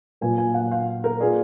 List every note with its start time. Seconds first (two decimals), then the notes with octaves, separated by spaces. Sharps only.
0.21 A#2 F#3 A#3 F4 B4 G#5
0.38 G#5
0.54 F#5
0.71 F5
1.04 A#4
1.20 A#3 F4 G#4 B4 D5